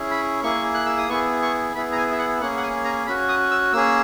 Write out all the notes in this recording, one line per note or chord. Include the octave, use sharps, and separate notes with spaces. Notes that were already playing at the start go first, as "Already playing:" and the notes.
Already playing: C#4 E4 G#4
B5
A#3 E4 G#4 C#6
F#6
E6
D#6
B3 E4 G#4 C#6
C#6
B3 E4 G#4 B5
A#5
G#5
E5
F#5
A#3 C#4 G#4 F#5
F#5
G#5
A#5
C#4 F#4 B5
D#6
E6
A#3 C#4 G#4 E6